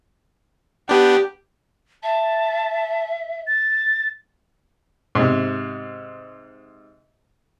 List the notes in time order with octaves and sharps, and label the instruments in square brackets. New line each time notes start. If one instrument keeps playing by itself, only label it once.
[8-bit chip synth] B3 D4 [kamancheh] G4
[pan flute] E5 [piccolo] A5
[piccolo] A6
[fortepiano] G#2 C3